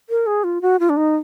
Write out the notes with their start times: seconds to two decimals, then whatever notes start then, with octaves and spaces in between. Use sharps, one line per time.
0.10 A#4
0.27 G#4
0.44 F4
0.62 F#4
0.80 F4
0.90 D4
0.97 D#4